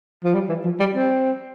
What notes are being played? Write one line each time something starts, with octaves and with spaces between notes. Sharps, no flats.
F3
G3
E3
F3
G3
C4